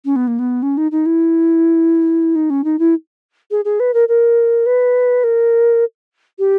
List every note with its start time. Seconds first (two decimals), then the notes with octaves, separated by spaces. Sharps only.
0.05 C#4
0.16 B3
0.27 A#3
0.39 B3
0.62 C#4
0.77 D#4
0.91 D#4
1.06 E4
2.35 D#4
2.50 C#4
2.64 D#4
2.79 E4
3.51 G#4
3.65 G#4
3.80 B4
3.94 A#4
4.08 A#4
4.66 B4
5.24 A#4
6.39 G4